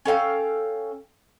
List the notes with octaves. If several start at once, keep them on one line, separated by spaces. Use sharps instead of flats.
C#4 A4 F5 G5